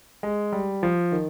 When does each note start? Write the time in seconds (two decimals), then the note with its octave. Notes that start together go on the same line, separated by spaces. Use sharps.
0.23 G#3
0.52 G3
0.83 F3
1.12 D#3